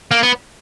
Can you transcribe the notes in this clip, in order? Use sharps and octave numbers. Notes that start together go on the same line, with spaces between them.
A#3
B3